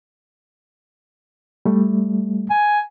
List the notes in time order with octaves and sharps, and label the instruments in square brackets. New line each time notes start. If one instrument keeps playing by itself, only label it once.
[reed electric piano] G3 A3
[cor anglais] G#5